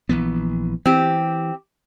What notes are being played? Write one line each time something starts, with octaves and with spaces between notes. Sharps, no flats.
A#1 E3 B3
E3 C4 G4